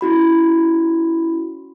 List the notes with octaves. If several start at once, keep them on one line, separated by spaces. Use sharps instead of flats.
C#4 E4 F#4 B5